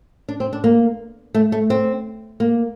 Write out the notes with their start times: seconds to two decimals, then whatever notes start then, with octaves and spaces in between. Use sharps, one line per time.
0.29 D4
0.40 C4
0.53 D4
0.64 A#3
1.34 A3
1.52 A3
1.70 C4
2.40 A#3